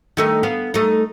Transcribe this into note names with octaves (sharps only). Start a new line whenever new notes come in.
D#3 A3 D#4
B3 F5
A3 D#4